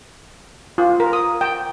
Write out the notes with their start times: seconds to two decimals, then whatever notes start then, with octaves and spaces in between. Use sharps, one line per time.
0.78 F4
1.00 A#4
1.13 D#6
1.41 G5